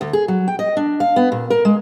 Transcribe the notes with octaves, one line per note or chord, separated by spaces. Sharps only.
D2
G#4
F#3
G5
D#5
D4
F5
B3
A#2
A#4
G#3